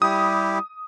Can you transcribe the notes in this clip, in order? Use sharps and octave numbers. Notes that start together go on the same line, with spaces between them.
G3 E4 G4 D#6